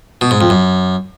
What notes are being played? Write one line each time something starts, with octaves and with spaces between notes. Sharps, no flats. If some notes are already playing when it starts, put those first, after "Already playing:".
B2
G#2
F2
F#2